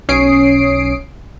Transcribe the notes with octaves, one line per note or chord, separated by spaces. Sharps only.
B1 C#4 C#5 D#6 C7 D7